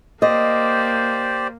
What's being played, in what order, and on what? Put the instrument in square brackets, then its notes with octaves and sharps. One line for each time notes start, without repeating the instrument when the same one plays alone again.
[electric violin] A#3 [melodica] G4 C5 D5 [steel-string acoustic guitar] D#5